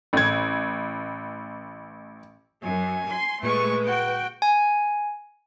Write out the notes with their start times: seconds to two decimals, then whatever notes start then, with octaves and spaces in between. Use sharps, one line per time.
0.13 A1 G#6
2.63 F#2 G#5
3.12 C6
3.43 A#2 G#3 A3 B4 C#6
3.87 F#4 G5
4.42 G#5